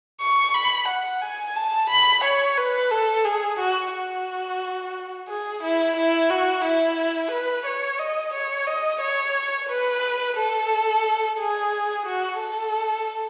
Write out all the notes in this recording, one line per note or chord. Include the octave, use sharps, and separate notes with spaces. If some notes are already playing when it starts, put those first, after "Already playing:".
C#6
B5
F#5
G#5
A5
B5
C#5
B4
A4
G#4
F#4
F#4
G#4
E4
E4
F#4
E4
B4
C#5
D#5
C#5
D#5
C#5
B4
A4
G#4
F#4
A4